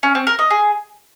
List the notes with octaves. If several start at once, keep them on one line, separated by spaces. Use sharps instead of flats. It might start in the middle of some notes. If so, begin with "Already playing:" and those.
C#4
C4
A#4
D#5
G#4